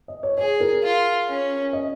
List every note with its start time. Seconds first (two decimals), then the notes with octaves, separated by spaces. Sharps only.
0.08 D#5
0.23 C#5
0.38 G#4 C#5
0.61 A#4
0.83 F4
1.28 C#4
1.73 D#5